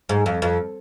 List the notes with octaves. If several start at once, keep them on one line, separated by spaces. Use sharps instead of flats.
G#2
F2
F2